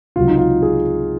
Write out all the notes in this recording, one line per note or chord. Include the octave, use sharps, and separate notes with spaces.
C#2 C3 F#3 F4
D#4
F4
G#4